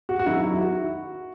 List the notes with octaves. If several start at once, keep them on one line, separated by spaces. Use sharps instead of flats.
F#4
F#4
D#3 F#3 E4
E4
F#4